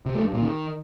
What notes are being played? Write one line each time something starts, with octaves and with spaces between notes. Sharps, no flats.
C3
A3
G2
A#2
D#3